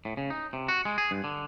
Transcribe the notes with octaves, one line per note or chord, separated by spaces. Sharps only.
A2
C#3
D#4
C3
F#4
G#3
G#4
G2
D3